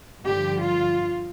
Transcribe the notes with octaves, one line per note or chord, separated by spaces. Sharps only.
G2 D3 F3 G4
F4